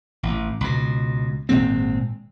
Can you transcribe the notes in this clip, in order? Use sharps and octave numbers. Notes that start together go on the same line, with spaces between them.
A1
C#2 B2
G#1 A#2 G#3 C4